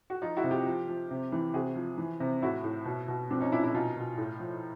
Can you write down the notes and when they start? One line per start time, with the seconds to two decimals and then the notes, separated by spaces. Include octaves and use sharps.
0.10 F#4
0.22 F3 D#4 F4
0.37 E4 F#4
0.44 C3
0.51 F4 G4
0.67 F3
0.88 F3
1.11 C3
1.32 E3
1.54 C3 F#4 G#4
1.76 F3
1.98 E3
2.20 C3
2.42 A2 E4 F#4
2.64 A2
2.86 B2
3.08 B2
3.30 F3 C4 D4
3.41 C#4 D#4
3.51 A#2 D4 E4
3.63 D4 E4
3.74 B2 D#4 F4
3.96 B2
4.17 A2
4.40 F3